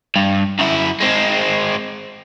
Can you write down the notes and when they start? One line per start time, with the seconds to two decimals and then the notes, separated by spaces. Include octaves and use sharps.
0.16 G2
0.59 F#2 E4
1.00 G#3 C4